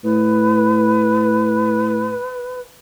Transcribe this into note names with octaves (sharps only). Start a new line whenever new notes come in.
A2 B4